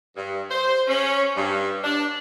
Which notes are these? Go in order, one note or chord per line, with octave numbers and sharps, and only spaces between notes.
G2
C5
C#4
G2
D4